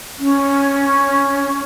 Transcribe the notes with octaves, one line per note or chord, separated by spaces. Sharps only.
C#4